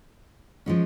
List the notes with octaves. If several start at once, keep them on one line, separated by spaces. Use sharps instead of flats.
F3 G#3 C#4